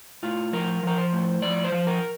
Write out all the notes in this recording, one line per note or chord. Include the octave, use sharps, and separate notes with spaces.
A2 F4
F3 A#4
F3 A#4
C5
A2
F3 D5
C5
F3
A#4